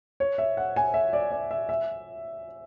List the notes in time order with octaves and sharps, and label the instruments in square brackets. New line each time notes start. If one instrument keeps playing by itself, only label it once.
[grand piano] C#5
E5
F#5
G#5
E5
D5
D5
E5
E5